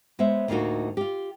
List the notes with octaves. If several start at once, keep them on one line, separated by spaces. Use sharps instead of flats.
G#3 B3 C5 C#5 E5
D2 A2 A#3 D#4 F4 F#4
F4 G4